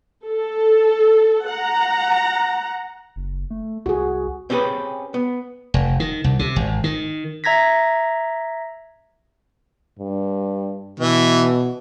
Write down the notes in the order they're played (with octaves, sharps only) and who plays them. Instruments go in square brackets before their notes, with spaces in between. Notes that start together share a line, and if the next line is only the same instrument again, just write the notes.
[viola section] A4
F#5 A#5
[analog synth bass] F#1
A3
[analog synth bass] C2 [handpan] F#4 G#4
[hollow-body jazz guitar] C4 C#4 G4 G#4 B4
B3
[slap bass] F1
D#3
C2
C3
G#1
D#3
[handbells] E5 A#5 G#6 A#6 B6
[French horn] G2
[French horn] B2 [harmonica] E3